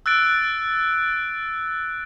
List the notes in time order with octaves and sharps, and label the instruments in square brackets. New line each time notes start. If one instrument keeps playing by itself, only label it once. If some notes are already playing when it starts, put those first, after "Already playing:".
[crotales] E6 F#6 A6 D7